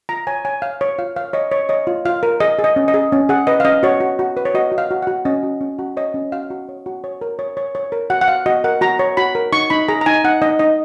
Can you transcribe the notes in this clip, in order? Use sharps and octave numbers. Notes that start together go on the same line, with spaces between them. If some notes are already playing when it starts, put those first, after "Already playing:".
F4 A#5
C#5 G#5
C#5 G#5
C#5 F5
C#5
F4 F5
C#5 F5
C#5 D#5
C#5
C#5 D#5
F4
F4 F5
A#4
G#4 D#5
G#4
D#5
C#4
D#5
G#4
C#4
G#4 F#5
B4 D#5
F5
C#4 D#5
F#4 C#5
F#4
F#4
B4
C#5
F#4 D#5
F#4
F5
F#4
F#5
F#4
C#4 D#5
F#4
C#4
F#4
C#5 D#5
C#4
F#4 F5
F#4
C#5
F#4
C#5
A#4
C#5
C#5
C#5
A#4
F#4 F#5
F#5
F#4 F5
F#4 D#5
A#4 F#5
F#4 A#5
C#5
F#4 B5
A#4
D#4 C#6
D#4 B5
G#4 A#5
A#5
D#4 G#5
D#4 F#5
D#4 D#5
D#4 D#5